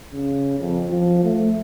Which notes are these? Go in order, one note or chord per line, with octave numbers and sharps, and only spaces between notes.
C#3
F2
F3
A3